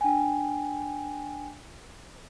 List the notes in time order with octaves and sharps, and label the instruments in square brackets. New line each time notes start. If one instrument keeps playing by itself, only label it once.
[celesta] D4 G5 G#5